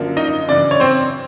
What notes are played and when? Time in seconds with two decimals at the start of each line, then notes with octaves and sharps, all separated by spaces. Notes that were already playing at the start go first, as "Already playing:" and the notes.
Already playing: F#2 D3 F3 A#3
0.17 D#4 D#5
0.48 F#2 C#3 E3 D4 D5
0.71 C#5
0.80 C4 C5